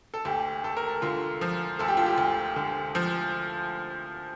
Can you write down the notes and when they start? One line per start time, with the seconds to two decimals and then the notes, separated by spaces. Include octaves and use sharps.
0.14 A4
0.25 D2 G4
0.64 D2 A4
0.77 A#4
0.88 A4
1.02 D3 F4
1.41 F3
1.79 D2 A4
1.88 G4
1.97 F4
2.06 G4
2.18 D2
2.56 D3
2.95 F3